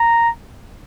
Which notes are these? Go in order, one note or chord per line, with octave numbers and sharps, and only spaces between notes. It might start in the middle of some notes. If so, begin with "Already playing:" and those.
Already playing: A#5